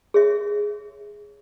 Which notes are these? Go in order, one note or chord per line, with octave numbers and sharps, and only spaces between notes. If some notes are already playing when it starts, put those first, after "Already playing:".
G#4 C#5 E5